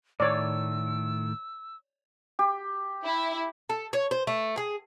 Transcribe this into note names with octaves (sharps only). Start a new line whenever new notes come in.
A2 D#3 A3 C#5 D5 E6
G4
E4
A4
C#5
C5
A3
G#4